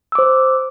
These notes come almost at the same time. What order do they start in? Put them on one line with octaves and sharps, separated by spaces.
E6 D6 C5